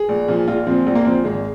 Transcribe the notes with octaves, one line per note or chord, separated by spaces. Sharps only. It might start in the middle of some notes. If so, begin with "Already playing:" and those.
Already playing: G#4
A#1
A#2 F3
A#1 F4
A#2 F3 C4
A#1
A#3
A#2 F3 C4
G#1 G#3